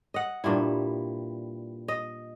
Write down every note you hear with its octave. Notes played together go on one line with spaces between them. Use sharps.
D#5 F#5
G2 A#2 G3 E4
D#5